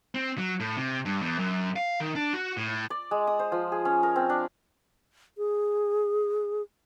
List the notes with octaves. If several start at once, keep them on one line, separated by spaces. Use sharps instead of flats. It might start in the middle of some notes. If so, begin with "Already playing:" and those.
C4
F#3
A2
C3
G2
E2
F#2
F5
D#3
D4
F#4
A2
D5
G#3
D#6
C5
F3
G#4
C#4
A#4
C4
D4
G#4